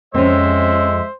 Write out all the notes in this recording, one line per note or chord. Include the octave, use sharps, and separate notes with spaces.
F2 G#3 C4 C#4 C5 E5